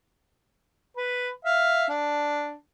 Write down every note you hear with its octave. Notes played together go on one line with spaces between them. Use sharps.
B4
E5 F5
D4